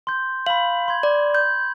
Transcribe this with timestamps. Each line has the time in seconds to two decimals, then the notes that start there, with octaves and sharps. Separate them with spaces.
0.07 C6 G6
0.47 F5 B5 F#7
0.88 C6 G#6
1.03 D5
1.35 G6